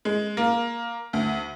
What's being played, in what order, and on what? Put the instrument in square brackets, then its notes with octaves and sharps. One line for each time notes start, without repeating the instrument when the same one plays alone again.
[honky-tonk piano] G#3
A#3
D2